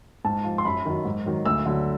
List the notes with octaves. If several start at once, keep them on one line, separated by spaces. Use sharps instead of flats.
G#2 A5
F3
C6
F#2 B5
D#3 F#3
G#2
D#3 F#3
D2 E6
D3 F#3